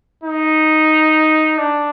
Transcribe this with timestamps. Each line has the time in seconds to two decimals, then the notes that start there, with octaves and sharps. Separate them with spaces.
0.24 D#4
1.58 D4